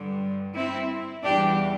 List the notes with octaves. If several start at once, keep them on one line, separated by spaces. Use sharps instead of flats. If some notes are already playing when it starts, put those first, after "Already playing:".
Already playing: G2 D3 G3
C4 E4
E2 E3 G3 D4 G4